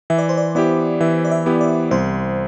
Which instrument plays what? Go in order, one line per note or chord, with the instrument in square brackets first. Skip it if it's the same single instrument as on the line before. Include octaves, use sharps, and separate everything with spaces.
[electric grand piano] E3 [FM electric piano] E5
[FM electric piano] D5
C5
D5
[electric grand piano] B3 E4 G4 [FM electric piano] D5
[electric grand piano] E3 [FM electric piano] E5
[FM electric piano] D5
E5
[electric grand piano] B3 E4 G4
[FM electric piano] D5
[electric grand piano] C2 [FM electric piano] C5